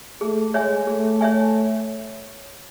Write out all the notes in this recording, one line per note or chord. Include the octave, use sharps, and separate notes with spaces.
A3 G#4
G#3 C#5 E5 G#5
A3 G#4
C#5 E5 G#5